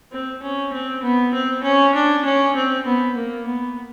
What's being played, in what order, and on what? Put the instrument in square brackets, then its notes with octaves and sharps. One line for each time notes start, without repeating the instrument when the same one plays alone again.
[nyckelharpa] C4
C#4
C4
B3
C4
C#4
D4
C#4
C4
B3
A#3
B3